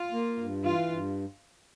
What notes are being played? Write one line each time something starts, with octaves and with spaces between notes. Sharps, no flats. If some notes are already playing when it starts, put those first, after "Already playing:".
Already playing: F4
A#3
G2
E3 F4
G2